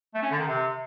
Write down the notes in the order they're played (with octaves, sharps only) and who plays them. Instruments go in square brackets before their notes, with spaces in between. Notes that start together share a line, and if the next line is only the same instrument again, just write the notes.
[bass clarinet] A3
C#4
D3
D#3
C3